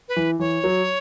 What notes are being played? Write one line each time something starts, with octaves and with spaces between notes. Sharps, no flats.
B4
E3
E3 C#5
F#3